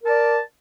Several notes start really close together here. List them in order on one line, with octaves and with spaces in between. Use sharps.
A#4 A5 D5